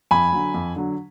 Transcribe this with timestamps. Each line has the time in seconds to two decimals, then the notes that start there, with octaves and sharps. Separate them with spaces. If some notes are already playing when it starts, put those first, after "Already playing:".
0.11 F2 G#5 B5
0.32 D3 F#3
0.54 F2
0.76 D3 F#3